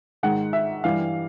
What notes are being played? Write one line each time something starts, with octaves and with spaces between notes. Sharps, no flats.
G#2 D#3 G#3 F#5
E5
G2 E3 G3 F5